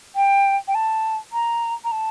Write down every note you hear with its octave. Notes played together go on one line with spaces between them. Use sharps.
G5
G5
A5
A#5
A#5
A5